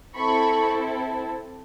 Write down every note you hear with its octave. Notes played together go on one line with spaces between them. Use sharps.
C4 E4 A4 B5 C#6